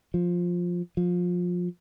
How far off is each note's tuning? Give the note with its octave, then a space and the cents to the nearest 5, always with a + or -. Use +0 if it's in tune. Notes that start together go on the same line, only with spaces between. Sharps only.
F3 +10
F3 +20